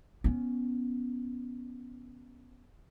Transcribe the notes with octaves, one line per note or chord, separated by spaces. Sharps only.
B3 C#4